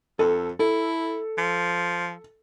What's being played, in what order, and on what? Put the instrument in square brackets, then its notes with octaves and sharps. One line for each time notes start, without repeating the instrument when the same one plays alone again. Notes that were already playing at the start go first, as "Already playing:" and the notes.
[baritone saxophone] F2 [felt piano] A4
[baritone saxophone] E4 [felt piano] A4
[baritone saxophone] F3